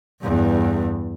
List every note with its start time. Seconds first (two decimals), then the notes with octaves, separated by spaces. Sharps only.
0.22 E2 G2